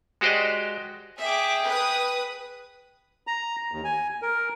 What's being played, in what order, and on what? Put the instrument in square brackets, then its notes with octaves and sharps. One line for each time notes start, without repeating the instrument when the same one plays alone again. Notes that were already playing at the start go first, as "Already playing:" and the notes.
[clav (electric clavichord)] G#3 F#4 G4 C5 D5 D#5
[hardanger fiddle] G#4 G5 [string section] E5 D6
[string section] B4 D#6
[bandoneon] A#5
D#2
G#5
A#4